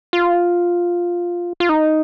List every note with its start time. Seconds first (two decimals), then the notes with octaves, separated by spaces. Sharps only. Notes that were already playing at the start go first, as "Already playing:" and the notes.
0.13 F4
1.60 F4
1.69 D#4